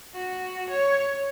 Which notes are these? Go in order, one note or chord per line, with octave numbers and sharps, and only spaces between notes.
F#4
C#5